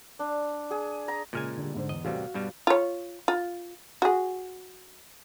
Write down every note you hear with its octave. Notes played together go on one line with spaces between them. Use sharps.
D4
G#4
A#5
A#2 C#3 G#3 G#5 F6
D3 G3
G#2 D3 C5
E2 D#5
A1 C3 G3 F#4 F5
G2 B2 G3
F4 C#5
F4
F#4 G#4